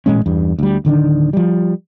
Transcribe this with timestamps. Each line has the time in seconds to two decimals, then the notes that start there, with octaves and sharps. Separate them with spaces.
0.06 A1 A#2 G#3 C#4
0.26 E2 G2
0.59 D2 G3
0.85 D1 D3 D#3 D4
1.33 F3 G3